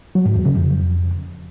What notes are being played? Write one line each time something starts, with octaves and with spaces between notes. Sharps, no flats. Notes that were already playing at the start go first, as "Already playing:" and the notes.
F#3
G#2
E2
C#3
F2